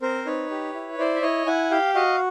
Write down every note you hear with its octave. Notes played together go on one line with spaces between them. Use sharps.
C4 A#4 C5
D#4 B4 C#5
G4
E4
E4 C5 D5
E5
E4 C#5 D#5
E4 F#5 G#5
G4 F5 G5
F#4 D#5 F5